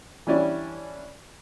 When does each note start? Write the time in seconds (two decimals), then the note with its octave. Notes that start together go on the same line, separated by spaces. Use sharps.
0.27 E3 G3 C#4 D4 E4